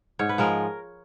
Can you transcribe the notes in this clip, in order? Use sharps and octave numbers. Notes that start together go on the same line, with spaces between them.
G#2 C#5
B4
F3 G#3 A#4